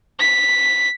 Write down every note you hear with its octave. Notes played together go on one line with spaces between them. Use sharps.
B6